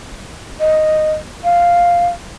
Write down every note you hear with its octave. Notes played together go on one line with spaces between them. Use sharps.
D#5
F5